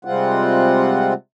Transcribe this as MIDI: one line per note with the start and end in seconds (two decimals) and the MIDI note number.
0.05 1.14 48
0.05 1.14 55
0.05 1.14 56
0.05 1.14 60
0.05 1.14 65
0.05 1.14 78